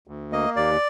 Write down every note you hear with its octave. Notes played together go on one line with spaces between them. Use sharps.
D2
A#3 D#5
D#2 D5